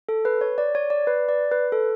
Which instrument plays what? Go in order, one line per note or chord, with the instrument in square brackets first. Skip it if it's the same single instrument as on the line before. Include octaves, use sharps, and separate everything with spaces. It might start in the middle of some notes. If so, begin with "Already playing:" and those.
[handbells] A4
B4
C#5
D5
C#5
D5
B4
D5
B4
A4